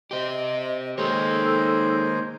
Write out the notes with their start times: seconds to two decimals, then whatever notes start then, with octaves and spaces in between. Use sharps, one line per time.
0.11 G4 C5 D#5
0.98 D#3 G#3 A#3 D#4 A4 C5 C#5